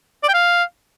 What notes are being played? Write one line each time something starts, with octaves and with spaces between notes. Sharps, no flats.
D5
G5
F5